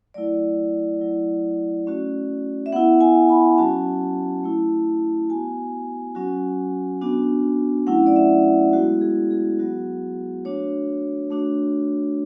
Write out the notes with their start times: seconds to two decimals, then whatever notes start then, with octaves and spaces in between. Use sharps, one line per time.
0.14 F#3 A3 E4 D5
1.01 F#3 A3 E4
1.87 A3 C#4 F#4
2.66 E5
2.72 B3 E4 F#5
3.01 G#5
3.29 B5
3.58 F#3 C#4 F#4 A5
4.44 A3 E4
5.30 B3 F#4 G#5
6.15 F#3 C#4 F#4
7.01 B3 D4 F#4
7.87 F#3 A3 C#4 E4 F#5
8.07 D5
8.16 E5
8.73 G#3 B3 E4 F#4
9.01 G#4
9.31 G#4
9.59 F#3 B3 F#4
10.45 A3 D4 F#4 C#5
11.30 A3 D4 F#4